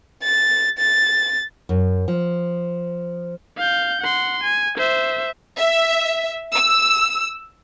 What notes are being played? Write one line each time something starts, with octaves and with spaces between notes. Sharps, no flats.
A6
A6
F#2
F3
F5 G6
F#5 C6
G#5
C5 E5
E5
E6